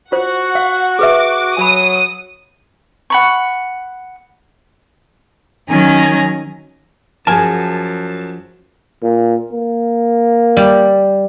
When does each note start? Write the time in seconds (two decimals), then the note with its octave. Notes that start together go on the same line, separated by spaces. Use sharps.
0.12 F4 F#4 C5 F#5
0.55 F5
0.99 G#4 B4 E5 D6
1.57 F#3 G#5 B5 D#6
3.10 F#5 B5 C#6
5.69 D#3 F#3 C#4 G#5 A#5
7.27 F#2 F3 F#4 G#4 A#4 G#5 A5
9.03 A#2
9.52 A#3
10.57 G3